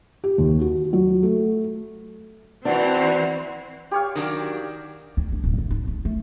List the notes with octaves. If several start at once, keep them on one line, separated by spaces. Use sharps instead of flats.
G4
D#2
F#4
F#3
A3
E3 C4 D4 F#4
G4 C#5 F5
D#3 F#3 D4
D2
D4
D1
G#2
D#4
G#3
A3